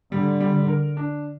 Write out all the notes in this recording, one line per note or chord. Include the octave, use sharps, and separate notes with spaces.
D3 G3
G3
A#4
D4